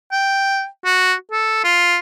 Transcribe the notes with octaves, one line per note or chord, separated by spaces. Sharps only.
G5
F#4
A4
F4